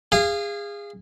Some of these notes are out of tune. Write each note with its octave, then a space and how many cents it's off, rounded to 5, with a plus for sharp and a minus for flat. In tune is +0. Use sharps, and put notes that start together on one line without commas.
G#4 -25 F5 -20